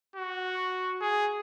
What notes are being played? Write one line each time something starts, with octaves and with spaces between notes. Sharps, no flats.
F#4
G#4